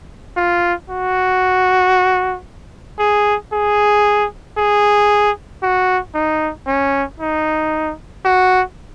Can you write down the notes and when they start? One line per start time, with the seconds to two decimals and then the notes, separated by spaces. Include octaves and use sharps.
0.37 F4
0.90 F#4
3.00 G#4
3.53 G#4
4.58 G#4
5.63 F#4
6.15 D#4
6.68 C#4
7.20 D#4
8.25 F#4